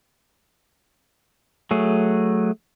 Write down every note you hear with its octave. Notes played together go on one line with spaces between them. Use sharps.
F#3 A3 G#4